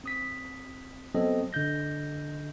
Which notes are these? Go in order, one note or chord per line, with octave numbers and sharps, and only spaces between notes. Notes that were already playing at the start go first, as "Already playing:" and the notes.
C4 D#6 B6
F#3 B3 C4 A4 D#5
D3 D#5 G6 A#6